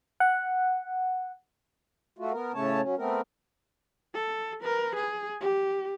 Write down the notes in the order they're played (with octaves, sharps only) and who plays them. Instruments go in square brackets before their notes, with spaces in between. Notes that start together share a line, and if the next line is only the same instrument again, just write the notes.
[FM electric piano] F#5
[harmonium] A3 F4 F#4
B3 A#4
A2 C#3 A3 C#4 C#5 A5
F#3 C#4
A3 B3 C4 A#4
[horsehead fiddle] A4
A#4 B4
G#4
G4